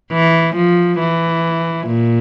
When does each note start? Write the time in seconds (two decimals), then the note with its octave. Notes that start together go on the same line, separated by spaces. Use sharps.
0.12 E3
0.57 F3
0.99 E3
1.87 A#2